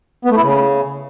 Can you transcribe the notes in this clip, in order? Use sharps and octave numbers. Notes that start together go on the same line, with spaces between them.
B3
A3
E4
C#3